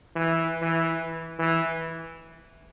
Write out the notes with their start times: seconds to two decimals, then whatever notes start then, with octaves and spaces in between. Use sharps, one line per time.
0.16 E3
0.62 E3
1.39 E3